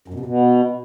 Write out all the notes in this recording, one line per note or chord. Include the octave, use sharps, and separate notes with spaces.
F#2
B2
C3
B2